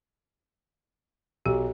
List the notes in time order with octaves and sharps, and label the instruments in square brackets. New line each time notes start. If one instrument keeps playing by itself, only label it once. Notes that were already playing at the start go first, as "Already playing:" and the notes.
[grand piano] B1 [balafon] G4